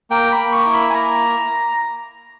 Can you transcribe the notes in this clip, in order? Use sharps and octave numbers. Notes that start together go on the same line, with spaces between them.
A#3 G5
B5
A#3
C#6
E4
B5
G#5
A#3 A#5